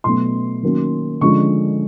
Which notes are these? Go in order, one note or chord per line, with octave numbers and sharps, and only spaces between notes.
B2 F#3 A3 C6
D#3 F#3 A#3 C#4
D3 F3 G#3 C#4 C#6